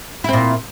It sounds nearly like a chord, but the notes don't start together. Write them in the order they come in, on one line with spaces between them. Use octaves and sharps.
E4 C4 A#2